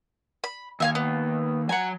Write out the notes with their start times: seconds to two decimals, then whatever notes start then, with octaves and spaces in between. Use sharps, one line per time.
0.44 B5
0.80 D#2 E5 F5 G#5
0.95 B3
1.69 F#3 F#5 G#5 A#5